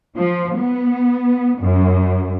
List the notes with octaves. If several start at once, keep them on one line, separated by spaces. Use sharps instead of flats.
F3
B3
F#2